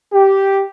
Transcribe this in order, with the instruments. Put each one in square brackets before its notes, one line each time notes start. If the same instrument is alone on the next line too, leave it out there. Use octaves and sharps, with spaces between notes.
[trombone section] G4